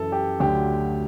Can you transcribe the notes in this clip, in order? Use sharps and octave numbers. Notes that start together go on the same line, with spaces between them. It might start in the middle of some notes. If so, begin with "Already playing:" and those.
Already playing: F#2 E3 A4
G4
D2 D3 F#3 G4